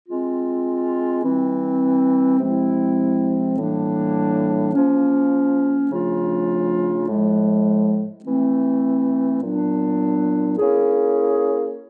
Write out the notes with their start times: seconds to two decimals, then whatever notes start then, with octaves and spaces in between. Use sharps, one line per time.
0.07 G#3 C4 F4
1.24 E3 G3 C4
2.40 C3 F3 G#3 C4 E4
3.58 A2 E3 G3 A#3 D4
4.74 F3 A#3 C#4
5.91 C#3 F3 A3 D4 F4
7.08 A2 F3 G#3
8.24 E3 A3 C4
9.42 A#2 F#3 B3 D4
10.58 A#3 C#4 E4 G#4